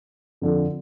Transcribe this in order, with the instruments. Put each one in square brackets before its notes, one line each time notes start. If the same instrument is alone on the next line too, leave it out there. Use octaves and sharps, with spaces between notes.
[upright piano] F2 D3 F3